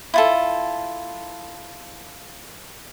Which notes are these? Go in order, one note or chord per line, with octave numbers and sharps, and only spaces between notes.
E4 F4 A4